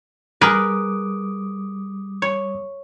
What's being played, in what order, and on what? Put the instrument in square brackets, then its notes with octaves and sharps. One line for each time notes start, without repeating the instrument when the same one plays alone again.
[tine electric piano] G3 D6 D#6 [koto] G#4 A#4 B4
[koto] C#5